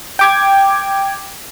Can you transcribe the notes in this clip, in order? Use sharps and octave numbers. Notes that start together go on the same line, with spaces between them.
G5 D6 G#6